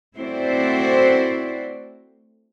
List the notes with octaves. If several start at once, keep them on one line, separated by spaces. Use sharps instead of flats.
A3 C4 E4 F#4 C5 D5